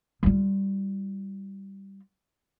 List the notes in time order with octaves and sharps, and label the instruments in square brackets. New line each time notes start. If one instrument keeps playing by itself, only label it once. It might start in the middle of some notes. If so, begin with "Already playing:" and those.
[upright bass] G3 F4